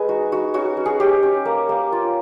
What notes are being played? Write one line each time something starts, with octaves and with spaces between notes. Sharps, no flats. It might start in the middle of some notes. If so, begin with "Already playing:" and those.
Already playing: G#3 G#4 B4
D#4 F#4
D#4 F#4
C#4 F#4
C#4
G#4
C#4 G4
C#4
A#3
A#3
F4